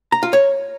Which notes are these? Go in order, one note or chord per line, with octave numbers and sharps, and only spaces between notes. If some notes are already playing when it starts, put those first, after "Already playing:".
A#5
F4
C#5